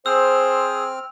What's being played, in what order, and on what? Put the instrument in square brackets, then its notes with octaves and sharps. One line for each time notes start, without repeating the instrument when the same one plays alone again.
[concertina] C4 F6 [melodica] G#4 [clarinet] C5 [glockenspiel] E6